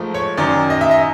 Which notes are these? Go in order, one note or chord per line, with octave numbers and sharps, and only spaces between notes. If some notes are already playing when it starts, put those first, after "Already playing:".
Already playing: G#2 F3 A3
C#5
F#2 D#3 F#3 D5
D#5
E5
D#5